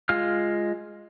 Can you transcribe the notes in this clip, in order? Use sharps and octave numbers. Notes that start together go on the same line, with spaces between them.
G#3 F4 F5 F6